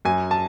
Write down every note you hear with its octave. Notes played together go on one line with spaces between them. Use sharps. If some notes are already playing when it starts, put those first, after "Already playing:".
F#2 G#5
A5